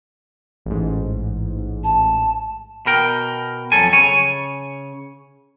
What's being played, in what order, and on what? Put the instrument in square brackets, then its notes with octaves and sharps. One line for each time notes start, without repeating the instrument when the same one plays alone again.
[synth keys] A1 G#2
[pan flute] A5
[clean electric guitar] B2 A#4 G5
F2 G#2 F#3 A4 G#5
C#3 C#5 G#5